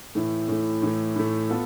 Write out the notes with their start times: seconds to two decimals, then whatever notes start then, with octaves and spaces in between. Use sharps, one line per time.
0.15 A2 E3 A3
0.48 A2 E3 A3
0.82 A2 E3 A3
1.16 A2 E3 A3
1.50 B3 F4 A4